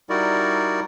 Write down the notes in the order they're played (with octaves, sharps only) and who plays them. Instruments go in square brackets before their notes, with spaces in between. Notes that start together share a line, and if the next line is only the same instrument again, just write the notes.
[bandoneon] G3 D#4 E4 F#4 A#4 D5